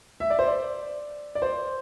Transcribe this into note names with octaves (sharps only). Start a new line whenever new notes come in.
E5
D5
C5
D5
D5
C5